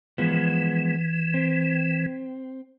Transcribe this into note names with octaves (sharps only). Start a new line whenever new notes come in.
E3 F3 G#3 B3
C4